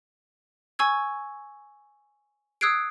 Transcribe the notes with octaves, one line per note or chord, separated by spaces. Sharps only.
G#5 C#6 E6 G#6
D#6 E6 F#6 G#6 C7 D7